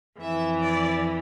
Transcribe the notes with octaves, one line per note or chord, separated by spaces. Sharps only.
F2 E3 E5
D5